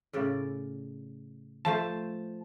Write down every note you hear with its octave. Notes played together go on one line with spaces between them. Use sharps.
A2 C#3 D5
F3 A3 C5 A5